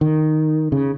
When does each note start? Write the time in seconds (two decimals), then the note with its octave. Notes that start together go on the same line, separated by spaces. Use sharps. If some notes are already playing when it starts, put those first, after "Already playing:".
0.01 D#3
0.72 C#3